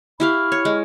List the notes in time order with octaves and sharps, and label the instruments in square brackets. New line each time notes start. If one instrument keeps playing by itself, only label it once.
[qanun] E4 G4 F5 [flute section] B5 C#6 F6
[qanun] C#5
G#3